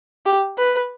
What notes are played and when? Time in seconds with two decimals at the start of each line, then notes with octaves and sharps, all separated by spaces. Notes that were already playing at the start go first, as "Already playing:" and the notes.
0.26 G4
0.58 B4